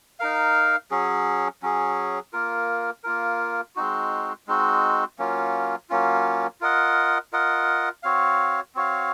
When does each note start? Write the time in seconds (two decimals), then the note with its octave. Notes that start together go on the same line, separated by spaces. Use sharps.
0.20 D#4 A#4 F5
0.91 F#3 C#4 G#4
1.63 F#3 C#4 G#4
2.33 A#3 F4 A#4
3.04 A#3 F4 A#4
3.76 G#3 C4 D#4 F#4
4.47 G#3 C4 D#4 F#4
5.19 F#3 A#3 C#4 F4
5.90 F#3 A#3 C#4 F4
6.61 F4 A#4 D#5 F#5
7.33 F4 A#4 D#5 F#5
8.03 C4 F#4 C#5 F5
8.75 C4 F#4 C#5 F5